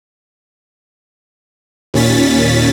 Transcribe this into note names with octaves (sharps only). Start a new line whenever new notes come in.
D#2 A#2 C#4 A6 B6